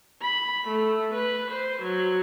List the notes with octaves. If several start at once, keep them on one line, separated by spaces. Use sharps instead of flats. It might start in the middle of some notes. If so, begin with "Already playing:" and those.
B5
A3
B4
C5
F#3